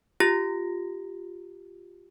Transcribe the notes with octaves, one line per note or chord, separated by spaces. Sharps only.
F4 G4 A#6